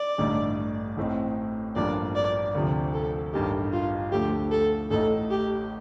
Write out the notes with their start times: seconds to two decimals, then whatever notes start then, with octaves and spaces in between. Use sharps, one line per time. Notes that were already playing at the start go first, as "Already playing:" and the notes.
Already playing: D5
0.18 A1 G2 D3 A3 D#4
0.97 A1 A2 A3 C4 D#4
1.76 A1 G2 F3 A#3 D4 D5
2.15 D5
2.55 D2 C3 F3
2.94 A4
3.33 A1 G2 D#3 G4
3.73 F4
4.12 D2 D3 F3 A3 G4
4.51 A4
4.91 A1 A2 A3 D#4 A4
5.31 G4